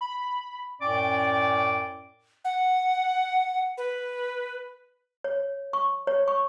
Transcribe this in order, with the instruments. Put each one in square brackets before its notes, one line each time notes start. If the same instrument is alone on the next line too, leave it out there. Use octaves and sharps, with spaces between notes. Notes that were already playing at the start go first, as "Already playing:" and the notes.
[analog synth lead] B5
[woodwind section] F#2 A2 C#4 D5 G5 D6
[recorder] F#5
B4
[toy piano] C#5
C#6
C#5
C#6